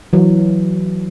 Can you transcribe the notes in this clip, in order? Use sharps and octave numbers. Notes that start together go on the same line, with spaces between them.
E3 F#3